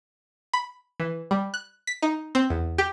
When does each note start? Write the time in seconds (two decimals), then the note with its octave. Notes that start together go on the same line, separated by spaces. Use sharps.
0.53 B5
1.00 E3
1.31 G3
1.54 F#6
1.87 B6
2.02 D#4
2.35 C4
2.50 E2
2.78 G4